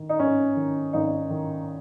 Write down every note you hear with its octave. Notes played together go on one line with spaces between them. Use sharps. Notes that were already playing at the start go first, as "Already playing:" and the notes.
Already playing: D#3
D#4
G#1 C#4
D#3
G#1 D#4
D#3